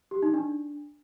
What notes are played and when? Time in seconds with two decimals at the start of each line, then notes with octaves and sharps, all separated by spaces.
0.11 G4
0.23 D#4
0.34 D4